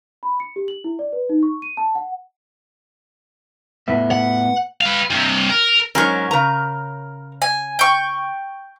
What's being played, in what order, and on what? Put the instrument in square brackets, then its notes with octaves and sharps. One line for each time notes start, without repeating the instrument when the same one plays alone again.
[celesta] B5
C#7
G4
F#7
E4
D5
B4
D#4
C#6
D#7
A5
F#5
[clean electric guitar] A2 B3 E5
[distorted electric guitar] F#5
B4 F5
G2 C3
A#4
[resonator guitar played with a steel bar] G#2 F#3 C#4 [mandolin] A#4 C#6
[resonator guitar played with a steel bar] C#3 A#5
[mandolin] G#5
G5 C#6